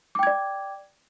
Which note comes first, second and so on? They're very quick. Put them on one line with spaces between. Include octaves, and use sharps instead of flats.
D6 G5 G#6 D5